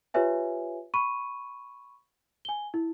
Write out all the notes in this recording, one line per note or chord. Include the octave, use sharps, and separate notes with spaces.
F4 G4 B4 C#5 E5 G#5
B5 C#6 D#7
G#5 G7
E4